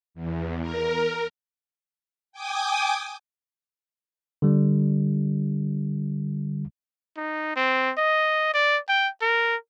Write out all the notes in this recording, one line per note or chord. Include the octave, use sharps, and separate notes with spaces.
E2
A#4
G5 G#5 D6 D#6
D3 G3
D#4
C4
D#5
D5
G5
A#4